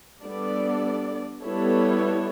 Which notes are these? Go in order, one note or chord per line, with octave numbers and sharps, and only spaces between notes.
G3 B3 D4 A4 D5
G3 B3 E4 A4 C#5